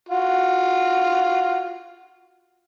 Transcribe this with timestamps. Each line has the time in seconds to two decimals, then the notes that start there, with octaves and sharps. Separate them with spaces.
0.09 F4 F#4